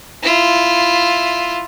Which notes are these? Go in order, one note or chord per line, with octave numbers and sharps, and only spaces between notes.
E4 F4